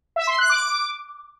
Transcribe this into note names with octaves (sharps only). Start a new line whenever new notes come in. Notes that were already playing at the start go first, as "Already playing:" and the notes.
E5
C6
F#6
D6